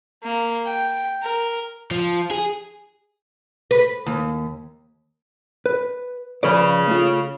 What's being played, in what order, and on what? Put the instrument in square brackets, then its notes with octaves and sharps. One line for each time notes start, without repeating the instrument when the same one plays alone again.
[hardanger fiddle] A#3
G5
A#4
[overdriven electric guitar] F3
G#4
[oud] B4
D#2
[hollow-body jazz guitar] B4
[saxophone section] C#3 [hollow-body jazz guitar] F3 B4 D5
[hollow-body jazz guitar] A3 F4